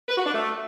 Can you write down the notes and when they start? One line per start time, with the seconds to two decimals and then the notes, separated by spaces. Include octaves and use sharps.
0.08 B4
0.17 F#4
0.25 D4
0.34 A3